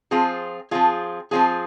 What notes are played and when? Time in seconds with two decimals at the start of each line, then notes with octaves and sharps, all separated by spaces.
0.11 F3 C4 F4 G#4
0.71 F3 C4 F4 G#4
1.31 F3 C4 F4 G#4